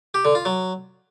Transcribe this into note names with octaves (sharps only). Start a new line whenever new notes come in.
G4
D3
F4
F#3